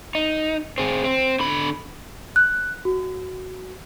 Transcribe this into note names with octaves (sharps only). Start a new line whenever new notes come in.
D#4
C4 G#4
C4
D3 B5
F#6
F#4